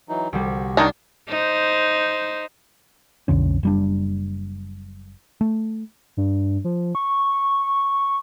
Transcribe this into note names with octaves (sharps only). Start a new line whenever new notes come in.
E3 F#3 D#4
C2 G3 F#4
D#3 F#3 D4 D#4
D#4 C5
B1 F2 D3 C#4
F#1 G3 D4
A3
G2
F3
C#6